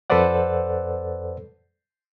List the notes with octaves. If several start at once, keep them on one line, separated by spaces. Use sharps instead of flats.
F2 A4 B4 C5 D5 F#5